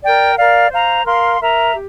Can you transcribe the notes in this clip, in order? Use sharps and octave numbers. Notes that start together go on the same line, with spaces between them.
A#4 D5 G5
A#4 D5 F5
C5 F5 A#5
A#4 F5 C6
A#4 E5 A#5
G4